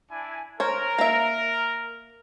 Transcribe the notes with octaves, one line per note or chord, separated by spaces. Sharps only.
D4 E4 G#5
A#4 C5 C#5
A#3 E5